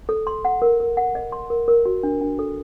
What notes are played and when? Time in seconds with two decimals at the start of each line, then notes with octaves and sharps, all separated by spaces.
0.09 A4
0.27 C6
0.45 F#5
0.62 A#4
0.80 A#4
0.97 F#5
1.15 D#5
1.32 C6
1.50 A#4
1.68 A#4
1.85 F#4
2.03 D4
2.21 D4
2.39 A4